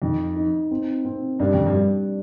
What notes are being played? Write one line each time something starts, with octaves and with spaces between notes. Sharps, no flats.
F2 D#4
D#4
C4
C4
G2 D4
F2
G2
G3